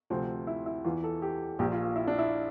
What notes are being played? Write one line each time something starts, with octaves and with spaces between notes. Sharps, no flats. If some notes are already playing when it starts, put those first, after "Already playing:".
D2 C3 F3 C4
E4
E4
E2 E3 F4
A4
G4
A#1 A#2 F3 G4
F4
F4
E4
D4
E4